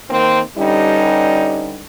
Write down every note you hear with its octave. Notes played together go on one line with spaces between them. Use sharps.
D#3 A#3 C4
G2 D3 G3 C#4 D#4